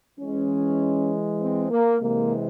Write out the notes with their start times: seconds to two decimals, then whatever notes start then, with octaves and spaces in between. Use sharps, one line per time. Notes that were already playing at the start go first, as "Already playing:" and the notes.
0.19 E3 G#3 C#4
1.41 C4
1.71 A#3
2.01 C3 E3 G#3 A#3